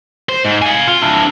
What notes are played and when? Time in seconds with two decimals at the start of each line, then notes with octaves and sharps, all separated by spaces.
0.29 C5
0.45 G#2
0.62 F5 G#5
0.88 F4
1.02 D4 E4